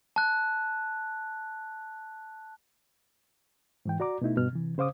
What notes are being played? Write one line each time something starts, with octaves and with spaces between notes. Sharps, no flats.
A5 F#6
G#2 E3 G5
F#4 D5 A#5 D6
B2 A3 D#4 E4
G2 B2 F6
C3 E3
C#3 C5 F5 D6 D#6